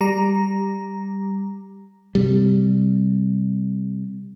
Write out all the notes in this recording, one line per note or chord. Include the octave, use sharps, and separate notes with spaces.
G3 A#5
C3 G3